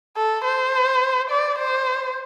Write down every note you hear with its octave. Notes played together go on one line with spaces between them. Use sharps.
A4
C5
D5
C5